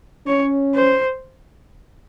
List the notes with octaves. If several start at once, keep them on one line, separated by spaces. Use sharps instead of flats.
C#4 C#5
C5